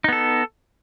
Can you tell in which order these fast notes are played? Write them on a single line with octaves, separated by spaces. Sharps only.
D#4 B3 A4